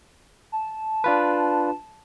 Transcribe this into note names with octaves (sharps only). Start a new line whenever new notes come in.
A5
D4 F4 B4